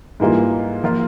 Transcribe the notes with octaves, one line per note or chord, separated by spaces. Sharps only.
G#2 E3 G3 A#3 F4
F3 A#3 F4